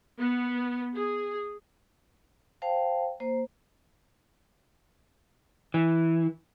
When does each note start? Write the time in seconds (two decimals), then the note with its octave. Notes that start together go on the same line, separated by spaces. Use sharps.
0.21 B3
0.94 G#4
2.62 C5 F5 G5 A5
3.20 A#3 C5
5.74 E3